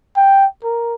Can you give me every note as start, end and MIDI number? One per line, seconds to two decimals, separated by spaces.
0.17 0.46 79
0.64 0.94 70